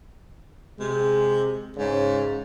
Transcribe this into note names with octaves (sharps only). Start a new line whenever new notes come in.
C3 G#3
G#2 C#3